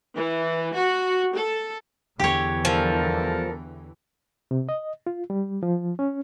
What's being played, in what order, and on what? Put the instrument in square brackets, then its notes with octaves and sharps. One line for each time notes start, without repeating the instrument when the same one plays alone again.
[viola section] E3
F#4
A4
[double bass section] E2 D3 E3 [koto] G4 C#5
[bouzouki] F3 [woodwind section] G3 A4 A#4
[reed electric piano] C3
D#5
F4
G3
F3
C#4